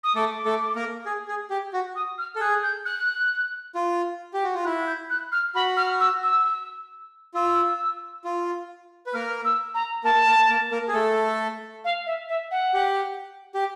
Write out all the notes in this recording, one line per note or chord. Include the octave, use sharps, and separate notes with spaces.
D#6
A3 A4 D6
A3 A4
A#3 A#4
G#4
G#4
G4
F#4
D#6
F6
A4
G#4 F#6
G6
F#6
F4
G4
F#4
F4
E4 F#6
G6
F#6
F6
F#4 B5
F6
E6
E6
F4 E6
F4
B4
A#3 A#4 F6
E6
A#5
A#3 A#4 A5
A#3 A#4
A#3 A#4
A#3 A#4
G#4
A3 A4
F5
E5
E5
F#5
G4
G4